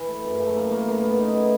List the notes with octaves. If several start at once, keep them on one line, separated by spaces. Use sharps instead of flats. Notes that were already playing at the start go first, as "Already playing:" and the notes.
Already playing: E3
A3
F#2
C#3
A3
E3 A#3
A3 A#3
F#2 A#3
C#3 B3
F#3 D#4
A3 E4